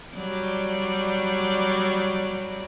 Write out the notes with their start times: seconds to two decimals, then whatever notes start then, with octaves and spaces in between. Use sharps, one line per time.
0.15 F#3 G3 D5